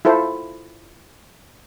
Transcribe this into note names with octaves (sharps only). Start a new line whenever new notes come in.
E4 F4 A4 C5